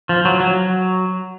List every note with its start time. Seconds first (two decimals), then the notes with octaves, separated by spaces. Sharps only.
0.09 F3
0.25 F#3
0.40 F#3